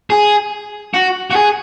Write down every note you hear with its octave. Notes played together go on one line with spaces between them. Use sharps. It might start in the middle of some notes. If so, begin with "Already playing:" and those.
G#4
F#4
F#4
G#4